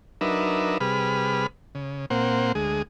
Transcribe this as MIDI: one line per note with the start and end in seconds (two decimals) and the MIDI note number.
0.21 0.78 54
0.21 0.78 62
0.21 0.78 63
0.21 0.78 70
0.21 0.78 71
0.21 0.78 76
0.80 1.47 48
0.80 1.47 55
0.80 1.47 68
0.80 1.47 71
0.80 1.47 83
0.80 1.47 89
1.75 2.06 49
2.10 2.52 46
2.10 2.52 58
2.10 2.52 60
2.10 2.52 72
2.10 2.52 78
2.55 2.82 38
2.55 2.82 56
2.55 2.82 68